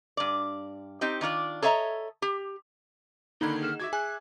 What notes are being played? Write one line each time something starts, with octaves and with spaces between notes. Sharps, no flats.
G2 D5
C4 D#4 G4
D#3 D4 F4 D5
A4 C#5 D#5 E5 A#5
G4
D3 D#3 A#3 D#4 F#5 B5 G#6 G7
G#4 F6 E7
F#4 E5 D6 G#6
G#4 G#5 F#6